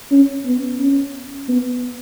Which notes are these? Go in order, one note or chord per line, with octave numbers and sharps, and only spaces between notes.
C#4
B3
C#4
B3